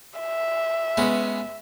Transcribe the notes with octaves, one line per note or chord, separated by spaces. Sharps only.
E5
G#3 B3 C#4